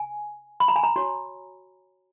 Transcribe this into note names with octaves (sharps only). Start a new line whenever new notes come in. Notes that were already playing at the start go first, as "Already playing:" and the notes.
Already playing: G#5
B5
A#5
G#5
A#5
F#4 C#5